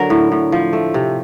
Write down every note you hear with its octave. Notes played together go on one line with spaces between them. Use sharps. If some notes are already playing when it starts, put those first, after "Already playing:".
Already playing: D3 F#3 A#4
A2
A2
F3
A3
C3